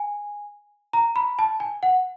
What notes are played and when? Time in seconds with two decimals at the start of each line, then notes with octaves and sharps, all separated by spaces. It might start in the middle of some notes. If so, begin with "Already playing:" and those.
Already playing: G#5
0.93 A#5
1.16 B5
1.39 A5
1.60 G#5
1.83 F#5